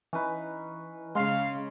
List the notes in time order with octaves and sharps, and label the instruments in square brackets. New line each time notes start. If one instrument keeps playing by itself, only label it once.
[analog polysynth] E3 [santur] C#4 D#4 B4
[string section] C#3 [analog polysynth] G#3 [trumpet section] F5 [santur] C6